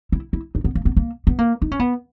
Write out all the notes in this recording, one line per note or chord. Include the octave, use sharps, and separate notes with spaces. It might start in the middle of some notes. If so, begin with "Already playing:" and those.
E4
E4
D#4
B3
A#3
B3
A#3
B3
A#3
D#4
C#4
B3